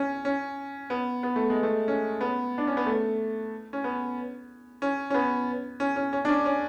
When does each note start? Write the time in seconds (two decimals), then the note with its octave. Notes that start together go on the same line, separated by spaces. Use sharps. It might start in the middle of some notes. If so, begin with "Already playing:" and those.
Already playing: C#4
0.25 C#4
0.90 B3
1.23 B3
1.36 A3
1.50 G#3
1.63 A3
1.88 C#4
2.21 B3
2.58 D4
2.67 C#4
2.77 B3
2.86 A3
3.73 C#4
3.84 B3
4.82 C#4
5.10 C#4
5.14 B3
5.80 C#4
5.96 C#4
6.13 C#4
6.25 D4
6.29 C#4
6.46 C#4